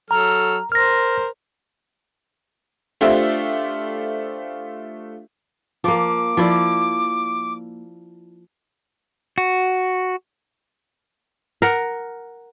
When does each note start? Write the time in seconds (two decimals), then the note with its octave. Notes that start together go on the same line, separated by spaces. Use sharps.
0.11 F#3 A4 A#5 F6
0.72 A#4 C5 F6 A#6
3.01 A3 D4 F4 G4 C5 E5
5.84 F3 A#3 D6
6.37 F3 E4 D5
9.38 F#4
11.62 A#4 F#5